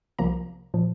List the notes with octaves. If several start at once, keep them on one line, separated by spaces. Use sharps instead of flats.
C2 C3 F3 A#3 A#5
A#2 F3